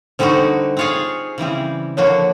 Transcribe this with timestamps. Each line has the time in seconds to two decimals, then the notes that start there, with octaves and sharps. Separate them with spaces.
0.19 D3 G3 C4 D#4 F#4 C5
0.77 C4 F4 G#4 C#5 F5
1.38 C#3 E3 G3 C4
1.97 D3 F3 A#3 D4 F#4 C#5